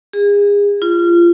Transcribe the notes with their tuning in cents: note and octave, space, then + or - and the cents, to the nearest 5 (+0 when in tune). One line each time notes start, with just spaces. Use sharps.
G#4 -35
F4 -25